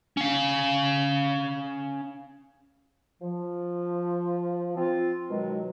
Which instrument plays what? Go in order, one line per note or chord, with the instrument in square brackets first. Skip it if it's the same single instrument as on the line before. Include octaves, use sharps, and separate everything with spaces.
[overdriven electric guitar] C#4 F5
[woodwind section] F3
C4 F4
B2 D#3 F#3 G#3